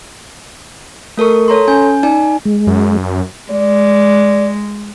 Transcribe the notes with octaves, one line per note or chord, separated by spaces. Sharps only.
A3 A4 A#4 C#6
A4 C#5 A#5 C6
C#4 G#5 G6
D#4 D5 G#5
G#3
F#2
G#3 D5